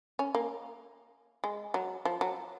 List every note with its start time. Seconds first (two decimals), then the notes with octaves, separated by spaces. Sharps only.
0.19 C#4
0.35 A#3
1.44 G#3
1.74 F#3
2.05 F3
2.21 F#3